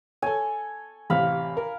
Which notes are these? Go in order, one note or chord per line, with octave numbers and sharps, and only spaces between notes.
A4 C#5 G#5
A1 C3 F5 B5
A#4